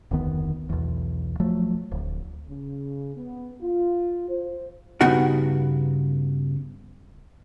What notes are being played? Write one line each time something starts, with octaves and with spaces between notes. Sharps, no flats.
F1 D2 D#3 B3
B1 E2
F3 F#3 A3
D1
C#3
B3
F4
C5
G2 C#3 B3 D#4 F#4 F#5